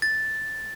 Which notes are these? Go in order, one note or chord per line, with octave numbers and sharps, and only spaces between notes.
A6